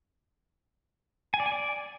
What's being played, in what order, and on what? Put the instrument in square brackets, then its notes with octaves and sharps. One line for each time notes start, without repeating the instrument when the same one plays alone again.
[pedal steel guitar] G#5
D5
G#5
D5